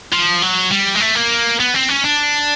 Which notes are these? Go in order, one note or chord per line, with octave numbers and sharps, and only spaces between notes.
F3
F#3
G3
G#3
A3
A#3
B3
C4
C#4
D4